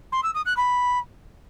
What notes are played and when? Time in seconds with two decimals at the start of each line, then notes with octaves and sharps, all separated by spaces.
0.12 C6
0.23 E6
0.35 D#6
0.46 F#6
0.57 B5